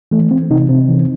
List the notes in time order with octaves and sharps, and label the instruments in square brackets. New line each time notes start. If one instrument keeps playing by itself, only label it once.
[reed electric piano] E3 A3
E3 C4
C3 D#4
C3 C4
E3